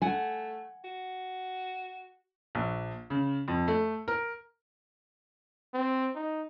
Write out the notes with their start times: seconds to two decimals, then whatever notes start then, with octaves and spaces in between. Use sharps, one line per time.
0.02 A3 F#5 G#5
0.84 F#4
2.55 A#1
3.10 C#3
3.48 F2
3.68 A3
4.08 A#4
5.74 C4
6.15 D#4